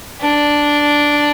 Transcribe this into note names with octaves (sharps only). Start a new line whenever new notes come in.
D4